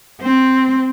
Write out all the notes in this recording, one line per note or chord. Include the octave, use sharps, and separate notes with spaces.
C4